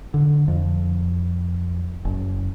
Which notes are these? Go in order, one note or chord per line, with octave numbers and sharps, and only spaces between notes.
D3
F2
F#1